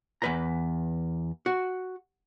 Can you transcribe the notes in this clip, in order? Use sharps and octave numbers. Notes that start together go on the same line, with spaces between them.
E2 B4 A#5
F#4